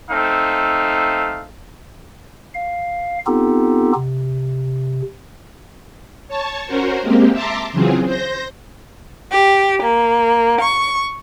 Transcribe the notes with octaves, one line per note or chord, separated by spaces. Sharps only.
A3 C4 D#4 F5
F5
B3 C4 D#4 F4 G4 A4
C3
C#5 A5 C#6
C#4 F#4 A#4 C5
G#3 A#3 C4 G4
E5 A5 A#5 C6 D6
C#3 E3 F#3 C4 F4 G#4
C5 G6 A#6
G4
A#3
C#6